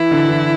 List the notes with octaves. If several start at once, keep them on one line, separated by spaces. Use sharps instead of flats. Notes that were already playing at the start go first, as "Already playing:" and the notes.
Already playing: E3 E4
D3
E3